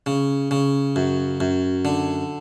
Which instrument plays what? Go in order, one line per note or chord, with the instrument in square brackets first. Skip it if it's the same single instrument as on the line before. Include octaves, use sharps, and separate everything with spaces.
[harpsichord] C#3
C#3
F#2
F#2
D3